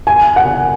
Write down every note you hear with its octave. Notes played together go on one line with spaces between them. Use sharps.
G#5
F#5